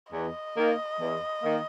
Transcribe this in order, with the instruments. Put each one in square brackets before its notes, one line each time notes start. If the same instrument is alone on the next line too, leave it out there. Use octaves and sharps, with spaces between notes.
[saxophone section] E2 [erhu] D#5
[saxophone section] D#3 A#3
E2
D#3 A#3